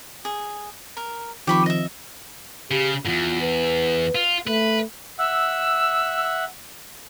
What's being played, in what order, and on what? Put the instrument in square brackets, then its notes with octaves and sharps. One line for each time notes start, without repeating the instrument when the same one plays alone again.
[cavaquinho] G#4
A#4
[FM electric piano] D#3 F3 C4 [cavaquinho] G4 B5 C#6
[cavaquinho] D#5 E5
[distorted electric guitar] C#3 [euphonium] G4
[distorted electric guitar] E2 G#2 [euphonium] F4
[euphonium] B4
[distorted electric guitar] F4
[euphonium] A3 [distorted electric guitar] B4
[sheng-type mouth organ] E5 F#5 [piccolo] E6